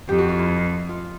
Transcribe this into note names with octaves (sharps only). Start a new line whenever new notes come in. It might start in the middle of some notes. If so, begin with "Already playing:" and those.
F2 G4
F#4
F4
E4
F4